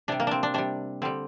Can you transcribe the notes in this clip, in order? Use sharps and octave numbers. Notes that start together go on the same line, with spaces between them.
C3 G3 D4
A#3
C4 D4
D4
C3 G3 D4
D3 G3 C4